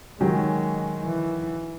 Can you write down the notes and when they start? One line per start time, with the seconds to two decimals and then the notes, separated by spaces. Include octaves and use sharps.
0.21 D#3 F#3 G#3 C#4 G4
1.04 E3